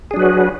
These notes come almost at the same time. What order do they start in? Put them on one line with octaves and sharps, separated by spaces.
G#4 D4 F#3 B4 F#4